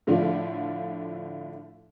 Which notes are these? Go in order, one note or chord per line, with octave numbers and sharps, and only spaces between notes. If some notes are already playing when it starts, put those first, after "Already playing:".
A2 D3 F3 A3 D4 F4